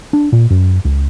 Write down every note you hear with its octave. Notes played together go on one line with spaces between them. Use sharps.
D4
A#2
F#2
C#2